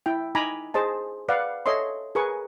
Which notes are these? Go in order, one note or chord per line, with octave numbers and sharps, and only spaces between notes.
E4 G5
D#4 G#5 A#5 B5 D6
G#4 C5 D#5 A5
B4 D5 F5 F#5
A4 C#5 D#5 E5 C6
G#4 A#4 B4 G#5 C#6